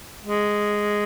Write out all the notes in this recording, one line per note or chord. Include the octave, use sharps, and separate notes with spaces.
G#3